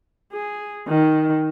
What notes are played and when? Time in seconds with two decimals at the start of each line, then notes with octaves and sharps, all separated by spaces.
0.33 G#4
0.88 D#3